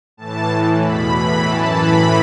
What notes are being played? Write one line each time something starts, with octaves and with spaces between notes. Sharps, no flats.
A2 E3 A5
A2 E3
E2 B2 B5
A2 E3 B5
F#2 E3 A5
A2 E3 B5